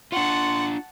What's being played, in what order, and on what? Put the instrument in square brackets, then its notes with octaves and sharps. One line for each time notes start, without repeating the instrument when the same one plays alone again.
[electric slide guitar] D4 F4 [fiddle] F#5 [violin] A5 C#6 [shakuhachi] C6